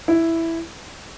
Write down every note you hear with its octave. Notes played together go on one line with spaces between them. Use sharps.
E4